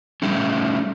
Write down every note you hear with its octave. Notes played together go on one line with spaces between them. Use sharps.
G3 A3 C#4